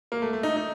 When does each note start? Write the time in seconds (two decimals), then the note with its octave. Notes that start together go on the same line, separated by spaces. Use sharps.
0.12 A#3
0.22 A3
0.33 A3
0.43 D#4
0.57 D#4